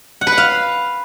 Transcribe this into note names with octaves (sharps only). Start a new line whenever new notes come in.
F#5
B4
F#5
F5